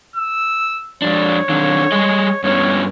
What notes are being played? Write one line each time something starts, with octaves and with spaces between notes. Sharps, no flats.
E6
F2 D4 C#5
D#3 C4 D4
G3 G#4 D#5
G2 B3 C#4 C#5